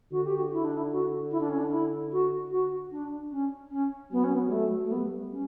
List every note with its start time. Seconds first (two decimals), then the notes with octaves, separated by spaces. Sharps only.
0.12 D3 F#4
0.25 G4
0.36 F#4
0.52 E4
0.64 D4
0.77 E4
0.92 F#4
1.31 E4
1.41 D4
1.49 C#4
1.58 D4
1.71 E4
2.12 F#4
2.51 F#4
2.91 D4
3.32 C#4
3.71 C#4
4.11 F#3 B3
4.24 C#4
4.35 B3
4.46 G3
4.52 A3
4.84 A3
4.91 G3 B3
5.32 C#4